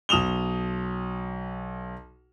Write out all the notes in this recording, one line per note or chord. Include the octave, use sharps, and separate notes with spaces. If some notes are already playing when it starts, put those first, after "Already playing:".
B1 D#6 E7 F7 G7